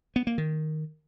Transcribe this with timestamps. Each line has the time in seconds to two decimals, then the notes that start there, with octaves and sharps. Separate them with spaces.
0.16 B3
0.27 A#3
0.38 D#3